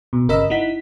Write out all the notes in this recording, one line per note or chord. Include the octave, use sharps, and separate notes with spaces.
B2
G1 C#3 A#4 D#5 B5 E6
D#4 E4 F#5 B6